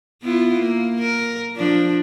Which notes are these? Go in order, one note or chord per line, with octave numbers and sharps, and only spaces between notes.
B3 E4 F4
A#3
A#4
F3 D4